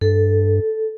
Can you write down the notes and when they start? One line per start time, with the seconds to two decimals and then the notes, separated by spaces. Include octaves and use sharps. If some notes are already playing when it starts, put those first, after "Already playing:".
0.01 G2 A4